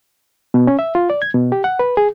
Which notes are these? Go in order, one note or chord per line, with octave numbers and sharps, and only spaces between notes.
B2
C#4
E5
F4
D5
G#6
B2
G4
F#5
B4
G#4